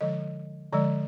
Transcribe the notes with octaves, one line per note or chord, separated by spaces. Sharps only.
D3 F3 G#3 D#5
D3 F3 G#3 D5